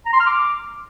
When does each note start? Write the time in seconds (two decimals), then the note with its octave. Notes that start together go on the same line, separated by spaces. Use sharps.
0.06 A#5
0.13 C6
0.20 F6
0.27 D6